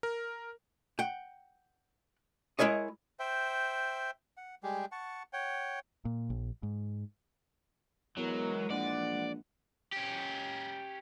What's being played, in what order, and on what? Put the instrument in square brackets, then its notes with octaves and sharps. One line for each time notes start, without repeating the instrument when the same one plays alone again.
[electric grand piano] A#4
[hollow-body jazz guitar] F#5 G5
G#3 E4 A#4 C#5 D#5
[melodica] C5 E5 G5
F#5
G3 G#3 G4 G#4
F#5 A5 C#6
C#5 F#5 G5
[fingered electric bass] A#2
A#1
G#2
[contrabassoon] E2 [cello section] E3 G#3 [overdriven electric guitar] F#3 [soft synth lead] A#4
[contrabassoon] A#1 [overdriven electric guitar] D5 [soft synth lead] F#5
[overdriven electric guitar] C#4 G4